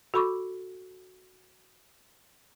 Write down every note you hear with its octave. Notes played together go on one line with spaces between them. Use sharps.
F#4 A4 B5 C#6 D6